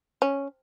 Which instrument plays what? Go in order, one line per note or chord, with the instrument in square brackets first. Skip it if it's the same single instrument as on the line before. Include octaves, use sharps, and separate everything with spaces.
[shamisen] C#4